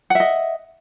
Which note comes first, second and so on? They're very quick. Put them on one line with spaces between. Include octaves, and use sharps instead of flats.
F#5 E5 D#5